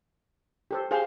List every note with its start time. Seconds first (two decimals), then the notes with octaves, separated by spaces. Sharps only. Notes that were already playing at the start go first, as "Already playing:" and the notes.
0.71 G4 A4 C5
0.91 G4 G#4 C5 F5 G#5